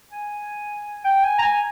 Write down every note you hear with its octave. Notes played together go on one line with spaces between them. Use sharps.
G#5
G5
G#5
A#5
G#5